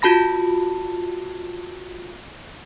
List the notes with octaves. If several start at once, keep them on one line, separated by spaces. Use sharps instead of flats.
F4 F#4 A5 B5 A#6